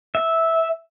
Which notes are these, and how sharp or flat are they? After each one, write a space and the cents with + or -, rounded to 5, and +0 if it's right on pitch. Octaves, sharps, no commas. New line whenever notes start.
E5 -10